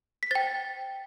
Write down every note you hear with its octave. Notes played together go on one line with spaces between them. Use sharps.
B6
C5 G5 A6